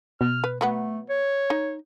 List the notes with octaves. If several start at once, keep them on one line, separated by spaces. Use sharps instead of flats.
B2 F6
B4
F#3 A3 B3 F#5
C#5
D#4